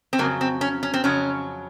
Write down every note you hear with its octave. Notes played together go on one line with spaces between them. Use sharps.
C4
F2 C#3 F#3 A#3
C4
C#4
C#4
C4
F2 C#3 F#3 C#4